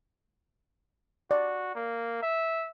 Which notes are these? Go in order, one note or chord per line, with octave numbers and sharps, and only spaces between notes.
F#4 D5
A#3
E5